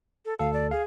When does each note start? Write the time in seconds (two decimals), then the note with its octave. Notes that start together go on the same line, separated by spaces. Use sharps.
0.25 A4
0.39 D2 A4 F5
0.53 D5
0.71 G#4 F5